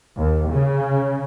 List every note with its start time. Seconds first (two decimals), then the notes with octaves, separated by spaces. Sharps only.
0.18 D#2
0.51 C#3